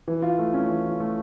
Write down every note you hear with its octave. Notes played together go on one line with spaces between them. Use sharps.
E3
F4
A3
C#4
E3
F4
A3